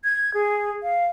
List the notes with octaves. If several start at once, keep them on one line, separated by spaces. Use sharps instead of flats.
G#6
G#4
F5